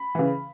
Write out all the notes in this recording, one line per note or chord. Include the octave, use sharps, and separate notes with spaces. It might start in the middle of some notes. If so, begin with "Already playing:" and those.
Already playing: B5
C#3 E3